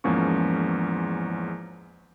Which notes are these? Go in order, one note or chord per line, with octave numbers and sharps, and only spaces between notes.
E2 G#2 F3 A#3 C#4 C#6